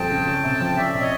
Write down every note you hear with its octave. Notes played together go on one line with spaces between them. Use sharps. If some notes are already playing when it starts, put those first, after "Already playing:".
Already playing: F2 G3 G5 A5
C#3
C#4
C3
F3
C#4 D5 E5
C3
C#5 D#5